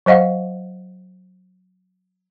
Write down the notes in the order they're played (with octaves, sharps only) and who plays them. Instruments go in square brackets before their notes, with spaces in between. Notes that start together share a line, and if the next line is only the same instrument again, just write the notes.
[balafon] F#3 C5 D#5 F5 F#5